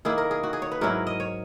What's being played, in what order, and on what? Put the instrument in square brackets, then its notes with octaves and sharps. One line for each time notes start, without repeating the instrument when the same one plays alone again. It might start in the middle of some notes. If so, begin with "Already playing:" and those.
[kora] D#3 A#3 E4 G#4
A#4
G#4
F#4
G#4
C#5
B4
G#2 F#3 C#4 E4 A#4
D#5
C#5